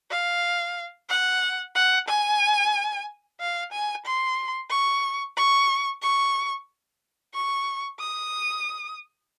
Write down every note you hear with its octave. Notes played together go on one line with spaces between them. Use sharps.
F5
F#5
F#5
G#5
F5
G#5
C6
C#6
C#6
C#6
C#6
D#6